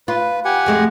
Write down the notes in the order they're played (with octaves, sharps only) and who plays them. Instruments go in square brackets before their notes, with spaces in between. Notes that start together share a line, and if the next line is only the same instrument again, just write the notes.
[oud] F4 [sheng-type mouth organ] B4
[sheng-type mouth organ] G4 F#5 G#5
[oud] F2 G#3 A3